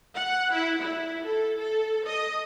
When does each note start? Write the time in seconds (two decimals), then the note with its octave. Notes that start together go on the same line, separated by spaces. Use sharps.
0.15 F#5
0.52 E4
0.82 E4
1.23 A4
1.58 A4
2.06 D#5